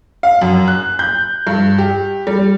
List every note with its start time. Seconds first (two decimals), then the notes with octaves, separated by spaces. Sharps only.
0.23 F5
0.41 F#2
0.68 F#6
0.99 G6
1.47 G2
1.78 G4
2.27 G3